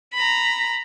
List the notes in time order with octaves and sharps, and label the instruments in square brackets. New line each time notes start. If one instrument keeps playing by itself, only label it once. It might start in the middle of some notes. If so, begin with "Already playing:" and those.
[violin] A#5 B5